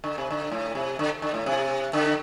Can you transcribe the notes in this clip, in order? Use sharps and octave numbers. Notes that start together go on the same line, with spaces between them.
D3
C3
D3
A2
C3
D3
D3
A2
C3
D3